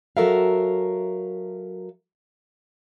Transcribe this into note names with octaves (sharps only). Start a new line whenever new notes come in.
F#3 F#4 A4 A#4 E5 F5